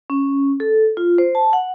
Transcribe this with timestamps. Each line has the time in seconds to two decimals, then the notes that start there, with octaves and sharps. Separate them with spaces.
0.10 C#4
0.60 A4
0.97 F4
1.18 C5
1.35 A5
1.53 F#5